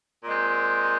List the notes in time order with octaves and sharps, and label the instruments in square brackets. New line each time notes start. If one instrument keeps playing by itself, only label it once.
[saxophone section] A#2 G#3 C4